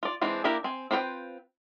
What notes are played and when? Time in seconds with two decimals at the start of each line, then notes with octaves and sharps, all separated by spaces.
0.03 F4 D5
0.21 E3 G#3 C4 D4
0.44 A#3 D4 E4 G4 A#4
0.64 C4 G#5
0.91 C4 F4 B4 C#5 G5